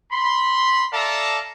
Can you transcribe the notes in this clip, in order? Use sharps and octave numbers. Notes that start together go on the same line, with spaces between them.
B5 C6
A4 D5 E5 F5 A5 A#5